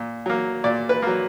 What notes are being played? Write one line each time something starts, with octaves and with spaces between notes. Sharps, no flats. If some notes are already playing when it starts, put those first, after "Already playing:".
Already playing: A#2
F#3 A#3
A#2 D5
B4
F#3 A#3